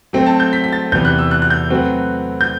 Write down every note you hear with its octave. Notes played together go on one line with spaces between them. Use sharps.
F#3 A3 C4 G5
A5
G6
B6
B6
A6
E2 C3 E3 G6
F#6
E6
F#6
F#6
G6
F#3 A3 C4 F#4 B4
G6